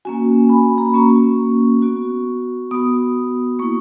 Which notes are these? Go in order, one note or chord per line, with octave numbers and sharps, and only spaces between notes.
A#3 C#4 F#4 G#5
B5
A#5
B5
A#3 C#4 F#4 C#6
B3 F#4
B3 F#4 D#6
A#3 E4 C#6